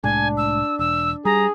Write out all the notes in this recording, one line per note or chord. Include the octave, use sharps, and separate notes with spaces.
C2 A2 G#3 D4 G#5
E6
E1 E6
G3 G#4 A#5